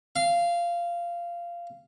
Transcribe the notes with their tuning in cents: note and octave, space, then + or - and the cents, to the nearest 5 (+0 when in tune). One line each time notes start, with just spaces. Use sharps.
F5 -15